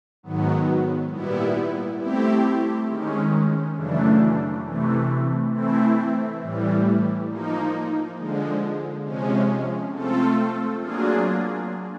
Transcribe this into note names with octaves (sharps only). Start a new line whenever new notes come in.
G#2 D#3 F#3 B3
A#2 G3 B3 E4
A3 C4 E4 G4
D#3 G#3 C#4
F#2 C#3 E3 A3 D4
C3 E3 A3
E3 A3 C4 E4
A2 E3 G3
F3 A#3 D#4
D3 F3 G#3
C3 F3 G#3 C#4
A3 C4 F4 A4
F#3 A#3 D4 F4 G#4